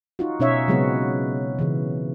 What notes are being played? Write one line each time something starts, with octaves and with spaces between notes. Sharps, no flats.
D#4 F4 F#4
B2 C#4 D#4 C#5 E5 F5
C#3 F#3 G#3 B3 C4 F#4
C#3 E3